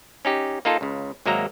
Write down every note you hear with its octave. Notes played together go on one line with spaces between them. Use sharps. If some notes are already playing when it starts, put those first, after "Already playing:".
C#4 D#4 G4
A#3 D#4 F4 A4
C#2 C#3
G#1 F#3 G#3 A#3 E5 A#5